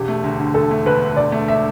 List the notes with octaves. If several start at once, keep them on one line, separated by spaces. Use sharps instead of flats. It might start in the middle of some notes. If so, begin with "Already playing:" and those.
Already playing: E1 G4
A3
D2
D3
E1 A4
A3
D2 B4
D3
E1 D5
A3
E5